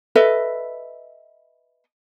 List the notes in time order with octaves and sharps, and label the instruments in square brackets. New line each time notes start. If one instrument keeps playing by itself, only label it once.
[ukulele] A4 B4 D#5 E5